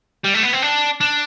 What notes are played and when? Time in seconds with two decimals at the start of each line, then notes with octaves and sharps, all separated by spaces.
0.24 G3
0.34 A3
0.43 B3
0.53 C4
0.62 D4
1.01 D4